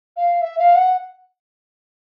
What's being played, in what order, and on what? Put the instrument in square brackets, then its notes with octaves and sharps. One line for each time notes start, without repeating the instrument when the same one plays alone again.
[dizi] F5
E5
F5
F#5